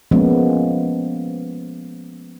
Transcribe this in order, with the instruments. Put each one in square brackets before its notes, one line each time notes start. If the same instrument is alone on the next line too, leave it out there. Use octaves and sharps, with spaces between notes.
[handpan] F3 G#3 A#3 B3 C#4